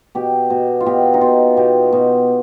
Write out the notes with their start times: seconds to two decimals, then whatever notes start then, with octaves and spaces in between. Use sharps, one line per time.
0.15 B2 G4
0.50 B2
0.80 F4
0.86 B2 G4
1.14 D#4
1.21 B2 F4
1.57 B2 G4
1.93 B2